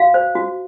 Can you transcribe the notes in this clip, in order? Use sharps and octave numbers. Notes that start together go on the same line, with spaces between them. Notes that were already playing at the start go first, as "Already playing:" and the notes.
Already playing: F#4 F5
C5
F#4